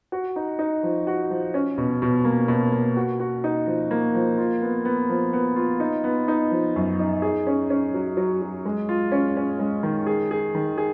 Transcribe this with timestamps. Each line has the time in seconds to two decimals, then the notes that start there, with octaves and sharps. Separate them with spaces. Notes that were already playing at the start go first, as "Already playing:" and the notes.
0.12 F#4
0.36 D#4
0.59 D#4
0.83 F3
1.07 F#4
1.30 F3
1.54 C#4
1.78 B2
2.02 B2
2.24 A#3
2.48 B2
2.72 A#3
2.96 F#4
3.20 F#4
3.44 D#4
3.67 F3
3.91 A#3
4.15 F3
4.38 F4
4.62 B3
4.85 B3
5.09 F3
5.33 B3
5.56 F4
5.80 D#4
6.04 B3
6.28 D#4
6.51 F3
6.76 F#2
6.99 D#4
7.22 G#4
7.47 C#4
7.70 C#4
7.94 F#3
8.17 F#3
8.42 F#3
8.65 G#3
8.89 F4
9.12 C#4
9.37 C#4
9.59 G#3
9.83 D#3
10.06 G#4
10.31 G#4
10.55 D#3
10.78 G#4